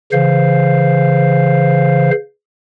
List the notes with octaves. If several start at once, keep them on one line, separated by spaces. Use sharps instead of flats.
C#3 E3 C5 F5